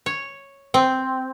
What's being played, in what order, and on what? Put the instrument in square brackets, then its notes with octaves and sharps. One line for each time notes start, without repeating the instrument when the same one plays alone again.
[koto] C#5
C4